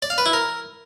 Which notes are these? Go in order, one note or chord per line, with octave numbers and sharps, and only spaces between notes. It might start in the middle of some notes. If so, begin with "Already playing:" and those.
D5
F5
B4
E4
A#4